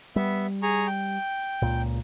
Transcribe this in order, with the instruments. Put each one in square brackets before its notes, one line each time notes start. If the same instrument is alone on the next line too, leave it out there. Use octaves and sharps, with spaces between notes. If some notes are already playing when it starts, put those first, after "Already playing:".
[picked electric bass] G3 [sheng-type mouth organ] B3 E5
[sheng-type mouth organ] G#4 A#5 C#6
G5
[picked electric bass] C#2 A#2